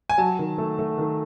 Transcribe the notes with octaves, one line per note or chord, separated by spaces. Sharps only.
G#5
F#3 A5
D#3
A3
A3
D#3